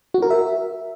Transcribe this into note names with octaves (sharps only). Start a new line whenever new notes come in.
F#4
A#4
E5